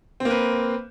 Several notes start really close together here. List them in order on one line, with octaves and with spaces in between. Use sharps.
C4 A#3 B4